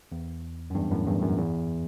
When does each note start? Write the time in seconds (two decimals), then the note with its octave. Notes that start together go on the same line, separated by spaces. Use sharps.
0.12 E2
0.70 F#2
0.75 E2 G2
0.91 F#2 A2
1.07 E2 G2
1.22 F#2
1.38 E2